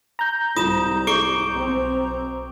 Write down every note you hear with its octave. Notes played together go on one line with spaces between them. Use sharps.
A#5 G6
C2 G#2 F4 D#6 E7
G4 C#6 D6 D7
B1 C4